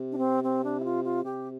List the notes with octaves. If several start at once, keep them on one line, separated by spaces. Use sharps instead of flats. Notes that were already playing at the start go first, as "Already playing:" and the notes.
Already playing: C3
D4
C4
C4
D4
E4
F4
F4
C3 G4